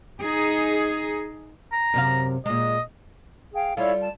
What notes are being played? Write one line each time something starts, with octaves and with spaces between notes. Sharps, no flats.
D#4 G#4
A#5
F#2 C3 F5
A#2 G#3 D#5
G#4 F5 G5
G3 E4 F4 A4 C#5 F5
A5